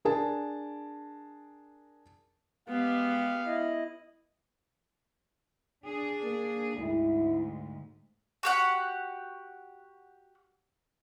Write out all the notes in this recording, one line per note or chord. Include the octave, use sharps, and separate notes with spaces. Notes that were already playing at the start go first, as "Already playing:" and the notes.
D4 G#4 A#4 A5
G#3 B3 G4 F5
E4 D#5
D4 G#4
A#3
D2 G#2 E4
F#4 G4 F#5